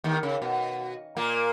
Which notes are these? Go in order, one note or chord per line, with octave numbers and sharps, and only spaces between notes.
D#2 D#3
C#3
B2
A#2 A#3